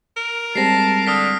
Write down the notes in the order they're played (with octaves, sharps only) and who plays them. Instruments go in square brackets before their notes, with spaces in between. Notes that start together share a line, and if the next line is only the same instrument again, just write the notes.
[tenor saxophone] A#4
[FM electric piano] G3 G#3 C4 [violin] A5 [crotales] A#6 C7
[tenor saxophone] D3 [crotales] D#6 F6 B6